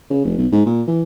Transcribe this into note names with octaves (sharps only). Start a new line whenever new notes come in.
C#3
F1
B1
G#2
A#2
E3